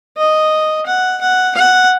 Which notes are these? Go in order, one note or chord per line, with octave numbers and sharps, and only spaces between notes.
D#5
F#5
F#5
F#5